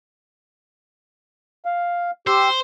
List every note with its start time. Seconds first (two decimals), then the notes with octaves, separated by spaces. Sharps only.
1.65 F5
2.27 G4 C5 E6